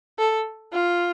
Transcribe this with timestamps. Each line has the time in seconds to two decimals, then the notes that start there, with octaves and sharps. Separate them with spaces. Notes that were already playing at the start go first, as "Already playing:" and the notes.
0.19 A4
0.73 F4